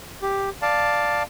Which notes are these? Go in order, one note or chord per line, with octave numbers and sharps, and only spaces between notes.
G4
D5 F5 A5